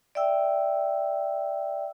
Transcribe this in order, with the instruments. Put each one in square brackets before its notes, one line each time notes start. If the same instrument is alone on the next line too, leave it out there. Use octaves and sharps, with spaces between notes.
[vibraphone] D5 E5 G5 E6